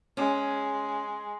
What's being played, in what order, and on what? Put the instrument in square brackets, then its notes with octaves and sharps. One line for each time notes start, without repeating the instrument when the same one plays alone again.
[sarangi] G#3 [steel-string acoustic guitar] C#4